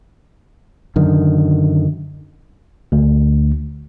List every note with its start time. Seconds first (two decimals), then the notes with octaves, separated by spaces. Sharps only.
0.96 F#2 D3 D#3
2.92 D2